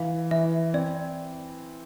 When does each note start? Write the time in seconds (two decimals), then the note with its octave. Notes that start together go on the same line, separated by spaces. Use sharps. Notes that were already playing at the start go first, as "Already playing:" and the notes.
Already playing: E3 F5
0.31 E3 E5
0.74 C4 D5